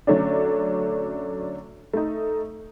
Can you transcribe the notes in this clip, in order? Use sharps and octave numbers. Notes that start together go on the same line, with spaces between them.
D3 F#3 A3 C#4 D4
A3 D#4